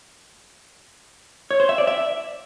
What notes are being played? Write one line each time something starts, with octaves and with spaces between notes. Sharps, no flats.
C#5
C5
E5
D5
E5